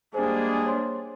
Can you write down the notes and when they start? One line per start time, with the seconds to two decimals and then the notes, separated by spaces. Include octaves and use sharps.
0.14 G3 G#3 A#3 D4 G#4 C5
0.65 C5 C#5 C6